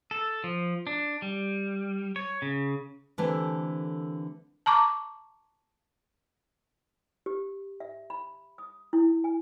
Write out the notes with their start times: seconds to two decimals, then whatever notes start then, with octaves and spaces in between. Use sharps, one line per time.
0.11 A4
0.44 F3
0.87 D4
1.22 G3
2.16 C#5
2.42 C#3
3.18 D3 E3 A3 C4 G4 A#4
4.66 A5 A#5 C#6 D6
7.26 G4
7.80 E5
8.10 B5
8.58 D#6
8.93 E4
9.24 G#5